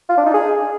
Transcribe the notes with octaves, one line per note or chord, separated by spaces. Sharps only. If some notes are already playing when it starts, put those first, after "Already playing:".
F4
D4
D#4
G#4